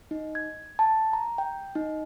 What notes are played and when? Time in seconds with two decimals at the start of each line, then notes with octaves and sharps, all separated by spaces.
0.11 D#4
0.35 G#6
0.79 A5
1.13 A#5
1.38 G5
1.75 D#4